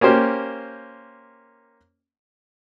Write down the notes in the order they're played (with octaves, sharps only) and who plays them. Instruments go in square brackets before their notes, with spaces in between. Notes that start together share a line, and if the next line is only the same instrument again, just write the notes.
[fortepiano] A#3 C#4 G4 C5